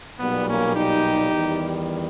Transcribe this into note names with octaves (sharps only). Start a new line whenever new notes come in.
B1 A#2 G3 B3
A#3 C#4
D#4 G4
E2 D#3 G3